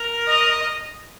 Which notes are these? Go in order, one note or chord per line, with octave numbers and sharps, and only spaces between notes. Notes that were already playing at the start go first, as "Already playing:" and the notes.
Already playing: A#4
D#5